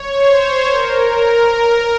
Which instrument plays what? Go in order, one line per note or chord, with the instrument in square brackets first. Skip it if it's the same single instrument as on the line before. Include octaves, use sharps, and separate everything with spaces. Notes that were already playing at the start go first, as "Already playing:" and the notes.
Already playing: [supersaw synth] C#5
C5
A#4